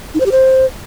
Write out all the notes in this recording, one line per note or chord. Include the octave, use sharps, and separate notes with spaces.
D#4
C5
G4
C5